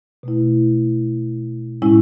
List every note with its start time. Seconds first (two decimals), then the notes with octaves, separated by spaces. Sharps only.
0.23 B2 A3 E4
1.82 A2 G#3 C#4 E4